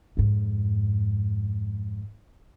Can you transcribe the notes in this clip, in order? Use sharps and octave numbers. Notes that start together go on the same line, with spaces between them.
F2 G#2